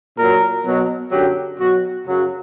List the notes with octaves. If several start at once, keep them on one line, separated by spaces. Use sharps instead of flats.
A#2 F#3 A#4
B2 F#3
F#2 D3 F#3 G4
B2 F#3 F#4
F#2 C#3 F#3